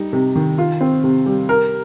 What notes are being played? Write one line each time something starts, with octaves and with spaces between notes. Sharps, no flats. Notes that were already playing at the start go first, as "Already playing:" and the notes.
Already playing: G3 D#4
C3
D#3
F4
C4
C3
G3
A#4